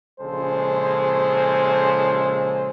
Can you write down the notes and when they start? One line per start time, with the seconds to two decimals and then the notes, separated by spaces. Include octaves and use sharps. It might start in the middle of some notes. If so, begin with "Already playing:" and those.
0.20 A#1 C#3 G#3 A4 C5